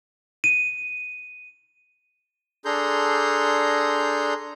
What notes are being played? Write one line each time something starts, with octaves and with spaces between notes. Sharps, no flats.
D#7
D4 G#4 A4 A#5 C6 G6